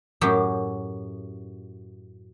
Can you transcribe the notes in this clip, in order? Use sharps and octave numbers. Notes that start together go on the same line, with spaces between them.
F#2 A2 F#3 G4